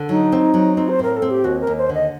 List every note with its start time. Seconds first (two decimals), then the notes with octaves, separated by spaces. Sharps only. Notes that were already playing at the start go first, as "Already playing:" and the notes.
Already playing: D3
0.09 F#3 D#4
0.32 C4
0.54 F#3
0.77 C4
0.89 C5
0.99 A2 A#4
1.17 A4
1.22 C4
1.30 G4
1.44 D#2 F#4
1.61 A#4
1.67 D#2
1.78 C5
1.89 D3
1.94 D#5